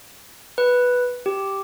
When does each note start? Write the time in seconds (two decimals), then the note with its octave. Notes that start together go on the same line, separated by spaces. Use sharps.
0.58 B4
1.26 G4